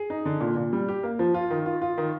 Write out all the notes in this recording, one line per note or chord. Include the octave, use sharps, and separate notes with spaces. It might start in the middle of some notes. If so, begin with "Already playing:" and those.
Already playing: G#4
D#4
D3
A#2
A#2
G3
G4
A#3
F3
F4
D#3
F4
F4
D#3